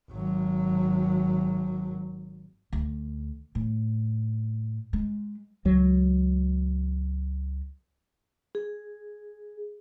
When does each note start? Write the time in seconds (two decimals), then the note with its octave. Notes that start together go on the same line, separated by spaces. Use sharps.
0.11 G#1 F#3
2.73 D2
3.55 A2
4.93 G#3
5.65 C#2 F#3
8.55 G#4